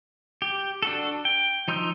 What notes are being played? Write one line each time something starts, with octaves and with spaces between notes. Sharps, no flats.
G4
D4 F#4 A4
G5
F3 D#4 C6 E6 G6